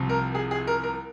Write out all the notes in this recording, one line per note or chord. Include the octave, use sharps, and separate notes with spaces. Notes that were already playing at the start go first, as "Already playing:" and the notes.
Already playing: C2 C3 F3
A#4
G#4
G#4
A#4
A#4